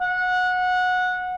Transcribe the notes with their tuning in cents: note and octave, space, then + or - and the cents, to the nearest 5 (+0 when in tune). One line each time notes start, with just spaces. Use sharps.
F#5 -20